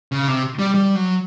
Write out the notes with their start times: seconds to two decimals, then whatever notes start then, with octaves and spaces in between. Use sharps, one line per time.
0.12 C#3
0.28 C3
0.59 G3
0.74 G3
0.95 F#3